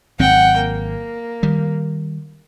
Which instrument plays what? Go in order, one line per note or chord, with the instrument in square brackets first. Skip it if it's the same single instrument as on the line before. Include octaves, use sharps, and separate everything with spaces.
[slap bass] G#1 F#3 C4 [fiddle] F#5 G5
[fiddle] A#3
[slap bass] D#3 G3